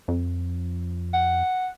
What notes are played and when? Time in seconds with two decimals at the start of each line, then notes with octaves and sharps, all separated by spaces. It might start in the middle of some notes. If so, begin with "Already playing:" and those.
0.08 F2
1.14 F#5